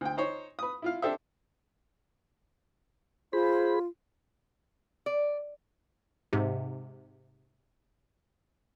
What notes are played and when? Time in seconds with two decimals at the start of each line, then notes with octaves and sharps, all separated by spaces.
0.01 D2 G5
0.17 D#4 C5 C#5
0.59 B4 D#6
0.82 E4 F4 F5
1.02 D4 G4 A4 C5 E5
3.33 F4 G#4 C5 B5
5.06 D5
6.33 G#2 C3